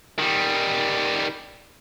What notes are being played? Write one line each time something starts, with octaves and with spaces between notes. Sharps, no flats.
D#3 G3